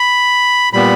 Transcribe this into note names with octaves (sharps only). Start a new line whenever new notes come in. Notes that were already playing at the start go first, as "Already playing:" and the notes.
Already playing: B5
A#2 G3 B3 B5